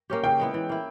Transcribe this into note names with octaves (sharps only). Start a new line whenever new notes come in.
A#3 C#4 G4
C#3 G5
G#3 B3 E4
E3
A#3 E4